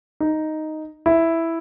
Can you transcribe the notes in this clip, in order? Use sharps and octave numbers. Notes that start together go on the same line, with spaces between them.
D#4
E4